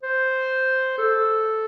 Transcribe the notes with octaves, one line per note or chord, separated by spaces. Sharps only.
C5
A4